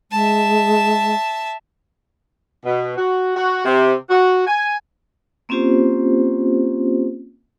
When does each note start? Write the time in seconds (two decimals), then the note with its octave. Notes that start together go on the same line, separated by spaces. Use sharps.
0.11 G#3 E5 A5
2.65 B2
2.97 F#4
3.35 F#4
3.65 C3
4.10 F#4
4.47 G#5
5.49 A#3 C4 C#4 F4 G4 C5